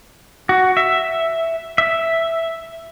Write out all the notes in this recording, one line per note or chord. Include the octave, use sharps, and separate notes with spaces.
F#4
E5
E5